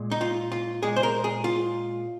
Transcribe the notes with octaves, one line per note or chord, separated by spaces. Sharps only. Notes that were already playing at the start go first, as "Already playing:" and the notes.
Already playing: A#2 G#3
D#4
F4
F4
A#2 G#3 G#4
C5
A#4
G#4
F4